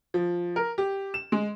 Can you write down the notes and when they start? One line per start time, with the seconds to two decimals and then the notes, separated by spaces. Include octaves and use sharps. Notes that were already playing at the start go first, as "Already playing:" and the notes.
0.14 F3
0.56 A#4
0.78 G4
1.14 E7
1.32 G#3